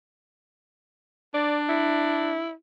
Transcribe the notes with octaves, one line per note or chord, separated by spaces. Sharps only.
D4 D5
E4